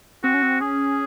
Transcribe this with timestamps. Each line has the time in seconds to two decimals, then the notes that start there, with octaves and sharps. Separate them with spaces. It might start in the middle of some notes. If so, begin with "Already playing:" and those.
0.24 C4 F#4
0.34 C#4
0.42 C4
0.61 C#4 G#4